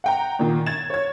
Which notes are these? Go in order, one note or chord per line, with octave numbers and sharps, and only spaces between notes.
F#5 G5 A#5
A#2 D#3
G#6 A6 E7
C#5 G#6